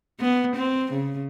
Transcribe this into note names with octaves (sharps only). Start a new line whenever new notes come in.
B3
C4
C#3